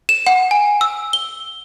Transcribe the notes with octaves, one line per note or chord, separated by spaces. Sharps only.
E7
F#5
G#5
E6
G7